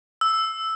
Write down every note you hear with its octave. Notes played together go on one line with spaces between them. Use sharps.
E6